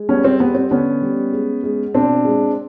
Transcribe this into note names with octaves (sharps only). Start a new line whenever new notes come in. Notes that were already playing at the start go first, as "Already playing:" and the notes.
Already playing: G#3
G3 B3 C#4
C4
G3 B3
C4
D3 B3 C#4
G3
G#3
G#3
B2 C4 D4
G#3